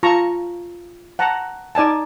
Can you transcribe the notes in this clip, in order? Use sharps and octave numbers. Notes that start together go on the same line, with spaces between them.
F4 A5 A#5 C#6
F#5 A5 A#5
D#4 D5 G#5 A5